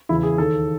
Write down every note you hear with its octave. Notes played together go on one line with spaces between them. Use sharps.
E2 C#3 E3 E4
G#4
D#2 D#3 A4